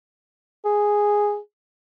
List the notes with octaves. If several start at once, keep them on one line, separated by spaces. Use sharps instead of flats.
G#4